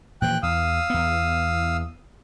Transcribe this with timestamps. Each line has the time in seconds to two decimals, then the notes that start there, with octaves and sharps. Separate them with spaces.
0.22 A#2 E3 F3 G5 F#6
0.43 E2 F5 D#6 E6
0.90 E2 B3